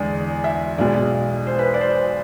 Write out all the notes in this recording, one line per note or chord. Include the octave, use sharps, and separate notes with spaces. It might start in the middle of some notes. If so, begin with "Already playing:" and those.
Already playing: E2 D3 G#3 D5
E5
B1 B2 G#3 D5
C5
B4
D5
C5